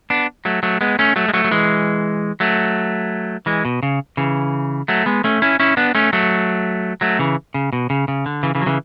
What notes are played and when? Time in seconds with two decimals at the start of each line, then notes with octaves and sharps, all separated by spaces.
0.10 B3 D4
0.45 F#3 A3
0.63 F#3 A3
0.81 G#3 B3
0.99 A3 C#4
1.16 F#3 A3
1.28 G#3
1.34 F#3 A3
1.44 F#3
1.51 E3 G#3
2.40 F#3 A3
3.46 E3 G#3
3.65 B2
3.83 C#3
4.17 C#3 E3
4.88 F#3 A3
5.06 G#3 B3
5.24 A3 C#4
5.42 C#4 E4
5.60 C#4 E4
5.77 B3 D4
5.95 A3 C#4
6.13 F#3 A3
7.01 F#3 A3
7.19 C#3 E3
7.54 C#3
7.73 B2
7.90 C#3
8.08 C#3
8.26 D3
8.43 C#3 E3
8.55 C#3 E3
8.62 F#3
8.66 C#3 E3